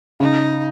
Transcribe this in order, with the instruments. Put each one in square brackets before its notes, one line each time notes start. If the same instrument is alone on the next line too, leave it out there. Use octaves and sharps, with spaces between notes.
[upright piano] C#3 [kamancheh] D#4